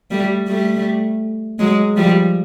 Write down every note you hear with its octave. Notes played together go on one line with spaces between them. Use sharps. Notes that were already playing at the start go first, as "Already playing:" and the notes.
G3 A3
G3 A3
F#3 G#3
F3 G3